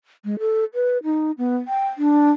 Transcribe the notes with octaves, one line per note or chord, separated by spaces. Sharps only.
G#3
A4
B4
D#4
B3
G5
D4